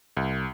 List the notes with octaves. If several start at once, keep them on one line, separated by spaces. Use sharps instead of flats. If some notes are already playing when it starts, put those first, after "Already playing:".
C2